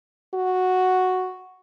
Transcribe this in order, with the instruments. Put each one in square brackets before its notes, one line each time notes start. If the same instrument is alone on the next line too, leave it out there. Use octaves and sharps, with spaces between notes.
[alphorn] F#4